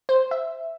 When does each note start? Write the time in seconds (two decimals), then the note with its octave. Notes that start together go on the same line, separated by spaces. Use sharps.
0.09 C5
0.31 E5